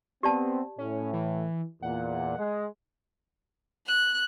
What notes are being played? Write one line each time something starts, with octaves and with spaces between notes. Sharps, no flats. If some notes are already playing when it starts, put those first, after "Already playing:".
B3 C4 G4 D5 A5
A2 C#4
E3
E2 A#2 F#5
G#3
F#6